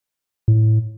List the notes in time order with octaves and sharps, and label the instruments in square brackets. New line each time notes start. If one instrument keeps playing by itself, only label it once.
[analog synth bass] A2